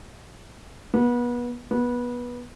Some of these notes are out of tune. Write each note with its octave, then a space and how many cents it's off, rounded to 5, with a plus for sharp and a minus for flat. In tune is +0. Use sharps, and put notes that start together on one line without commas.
B3 -30
B3 -20